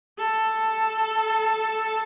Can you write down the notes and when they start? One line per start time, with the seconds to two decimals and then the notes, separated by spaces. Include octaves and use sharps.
0.18 A4